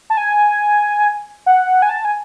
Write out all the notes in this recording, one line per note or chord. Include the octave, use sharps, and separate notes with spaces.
A5
G#5
F#5
G#5
A5
G#5